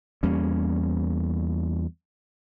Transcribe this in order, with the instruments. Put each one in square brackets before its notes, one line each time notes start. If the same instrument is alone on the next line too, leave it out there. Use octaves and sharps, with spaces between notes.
[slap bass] E2 G3 A#3 C#4